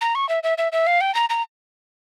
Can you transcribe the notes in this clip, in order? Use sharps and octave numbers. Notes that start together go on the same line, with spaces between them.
A#5
C#6
E5
E5
E5
E5
F5
G5
A#5
A#5